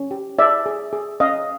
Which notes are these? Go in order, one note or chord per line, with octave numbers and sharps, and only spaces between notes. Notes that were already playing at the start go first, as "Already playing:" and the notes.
Already playing: C#4
G4
G#4 D5 E5
G#4
G#4
C#4 D#5 F5